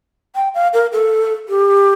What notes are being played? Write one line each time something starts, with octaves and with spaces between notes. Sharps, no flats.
G5
F5
A#4
A4
G4